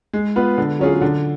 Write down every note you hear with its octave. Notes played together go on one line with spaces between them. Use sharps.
G#3
B3 F4 B4
D3
F#3 C#4 F4 G#4
D3